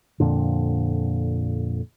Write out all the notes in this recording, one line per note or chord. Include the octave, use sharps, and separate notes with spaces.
F2 A#2 D3